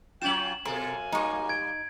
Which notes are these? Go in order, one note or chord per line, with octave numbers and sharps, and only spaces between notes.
F#3 C#4 F4 G5 E7 F#7
F#2 B2 A4 A#4 F5 G#5 C6
G3 A#3 D#4 C#6
G#6 D7